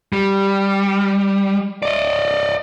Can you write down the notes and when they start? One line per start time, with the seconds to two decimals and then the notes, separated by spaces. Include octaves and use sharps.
0.13 G3
1.83 D5 D#5